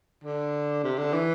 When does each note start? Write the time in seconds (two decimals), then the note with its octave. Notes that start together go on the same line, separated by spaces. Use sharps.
0.24 D3
0.84 C3
0.98 D3
1.13 E3